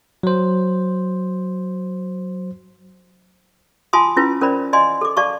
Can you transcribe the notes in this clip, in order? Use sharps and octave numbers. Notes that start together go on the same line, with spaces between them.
F#3 C5
F4 G#5 A5 C6 D6 D#6
C#4 E4 F4 B4
C#4 A#4 C5 D5 B5
D5 D#5 F5 G#5 C6
A4 D6
D5 F5 A5 C#6 D6